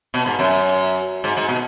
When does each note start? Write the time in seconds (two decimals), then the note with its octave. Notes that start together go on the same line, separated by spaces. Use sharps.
0.14 B2
0.26 G#2
0.39 F#2
1.24 G#2
1.37 G#2
1.49 B2